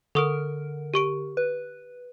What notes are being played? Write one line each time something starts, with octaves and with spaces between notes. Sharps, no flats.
D3 A4 A#4 C#6 D#6
G4 C#6 D7
B4